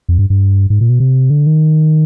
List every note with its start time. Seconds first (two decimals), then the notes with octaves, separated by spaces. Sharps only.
0.08 F2
0.19 G2
0.30 G2
0.70 G#2
0.81 A#2
0.90 B2
1.00 C3
1.30 D3
1.47 D#3